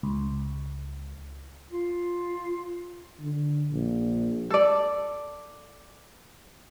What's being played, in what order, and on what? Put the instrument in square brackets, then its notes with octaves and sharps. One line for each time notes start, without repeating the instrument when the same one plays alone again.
[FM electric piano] C#2
[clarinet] F4
[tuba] D3
A#1
[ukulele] A4 D5